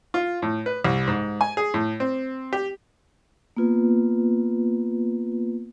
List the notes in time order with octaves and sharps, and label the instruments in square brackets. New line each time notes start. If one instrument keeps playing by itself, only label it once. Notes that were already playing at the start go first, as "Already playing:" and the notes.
[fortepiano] F4
A2
B4
C2
G#2
G#5
G#4
A2
C4
G4
[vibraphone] A#3 B3 F4 B4